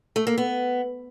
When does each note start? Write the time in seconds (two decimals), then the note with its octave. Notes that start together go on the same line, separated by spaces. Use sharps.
0.16 A3
0.27 A#3
0.38 B3